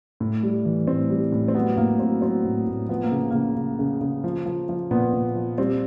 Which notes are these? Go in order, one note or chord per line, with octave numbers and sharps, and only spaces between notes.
A2
G3
E3
A2 C4
G3
A2
C4
F#3 B3
A2 A#3
F#3 C4
F#3 C4
A2
A2
F3 B3
A#3
C#3
C#3 A#3
C#3
C#3
C#3
F3
F3
F3
A#2 B3
A#2
F3
G3 C4